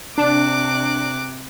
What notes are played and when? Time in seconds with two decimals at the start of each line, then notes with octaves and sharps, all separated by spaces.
0.18 C3 D4 D6 F#6